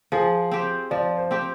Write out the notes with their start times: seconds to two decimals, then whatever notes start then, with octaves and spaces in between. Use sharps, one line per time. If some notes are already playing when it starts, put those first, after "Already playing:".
0.12 F3 G#4
0.51 C4 G4
0.91 F3 D5
1.17 C5
1.31 C4 G4